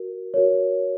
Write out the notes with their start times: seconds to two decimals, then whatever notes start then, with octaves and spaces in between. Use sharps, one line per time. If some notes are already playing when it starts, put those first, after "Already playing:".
Already playing: F#4 A#4
0.34 F#4 A#4 C#5